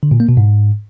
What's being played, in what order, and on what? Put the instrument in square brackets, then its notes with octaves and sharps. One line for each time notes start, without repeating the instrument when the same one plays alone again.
[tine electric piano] D3
A#2
A#3
B2
G#2